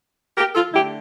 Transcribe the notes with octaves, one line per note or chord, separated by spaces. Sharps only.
G4 A#4
F4 A4
D3 A3 E4 G4